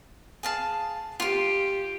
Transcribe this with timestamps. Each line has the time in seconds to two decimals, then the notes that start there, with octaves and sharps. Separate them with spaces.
0.43 G#4 F5 A5
1.20 F4 G4 C6